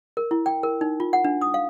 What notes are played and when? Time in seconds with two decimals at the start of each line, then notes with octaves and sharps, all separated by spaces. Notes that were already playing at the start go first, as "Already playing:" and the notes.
0.17 A#4
0.31 E4
0.46 G5
0.63 A#4
0.81 D#4
1.00 F4
1.13 F#5
1.24 D4
1.41 D#6
1.54 F5